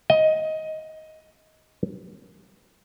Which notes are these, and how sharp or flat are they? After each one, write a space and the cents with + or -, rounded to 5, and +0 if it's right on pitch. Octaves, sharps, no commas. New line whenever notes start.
D#5 +15